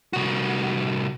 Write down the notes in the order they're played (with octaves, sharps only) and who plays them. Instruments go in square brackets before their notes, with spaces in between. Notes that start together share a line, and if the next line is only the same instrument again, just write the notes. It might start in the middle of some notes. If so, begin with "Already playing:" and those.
[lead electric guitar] C2 F#4